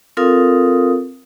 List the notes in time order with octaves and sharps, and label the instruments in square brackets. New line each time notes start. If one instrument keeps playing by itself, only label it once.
[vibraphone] C4 F4 A4 A#4 F5 D#6